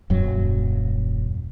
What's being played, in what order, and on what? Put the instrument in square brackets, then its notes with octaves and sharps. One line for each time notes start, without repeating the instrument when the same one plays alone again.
[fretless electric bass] D#1 F#2 F#3